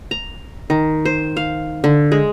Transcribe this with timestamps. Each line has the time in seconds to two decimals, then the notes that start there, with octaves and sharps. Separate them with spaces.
0.11 A#5
0.70 D#3
1.05 C5
1.37 F5
1.84 D3
2.12 G#3